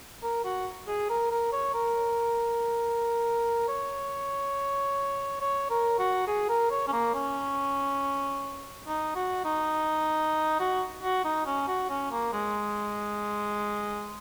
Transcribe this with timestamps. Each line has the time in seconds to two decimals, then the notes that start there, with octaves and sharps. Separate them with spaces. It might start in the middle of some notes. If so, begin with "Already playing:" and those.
0.23 A#4
0.45 F#4
0.87 G#4
1.10 A#4
1.31 A#4
1.53 C#5
1.74 A#4
3.69 C#5
5.41 C#5
5.70 A#4
5.99 F#4
6.28 G#4
6.49 A#4
6.71 C#5
6.88 C#4
6.93 A#3
7.14 C#4
8.87 D#4
9.16 F#4
9.45 D#4
10.60 F#4
11.03 F#4
11.25 D#4
11.46 C#4
11.68 F#4
11.90 C#4
12.11 A#3
12.33 G#3